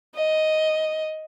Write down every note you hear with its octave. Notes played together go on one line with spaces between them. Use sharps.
D#5